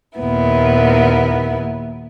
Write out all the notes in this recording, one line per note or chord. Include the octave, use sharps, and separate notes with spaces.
D#2 A#2 B3 E4